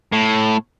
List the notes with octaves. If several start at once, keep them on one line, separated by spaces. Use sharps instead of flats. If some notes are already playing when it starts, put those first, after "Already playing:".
A2